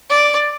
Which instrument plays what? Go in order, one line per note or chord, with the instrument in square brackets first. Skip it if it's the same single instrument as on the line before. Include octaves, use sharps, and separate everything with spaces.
[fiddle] D5